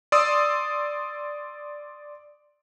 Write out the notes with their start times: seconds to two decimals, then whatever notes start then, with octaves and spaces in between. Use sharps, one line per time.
0.12 D5 C6 D#6 E6